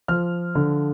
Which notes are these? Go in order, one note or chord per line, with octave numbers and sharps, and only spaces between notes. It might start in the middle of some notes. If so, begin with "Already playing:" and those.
F3 F6
D3